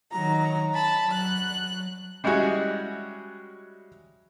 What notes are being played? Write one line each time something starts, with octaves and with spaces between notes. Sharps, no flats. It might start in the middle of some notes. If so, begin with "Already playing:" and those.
D#3 F#3 A#5
A5 B5
F#3 F#6
G3 G#3 C#4 E4 F#4 G#4